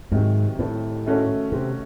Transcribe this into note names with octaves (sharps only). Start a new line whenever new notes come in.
G#2 C3 D#3 F#3
A2
D#3 A3 C#4 F#4 A4
C3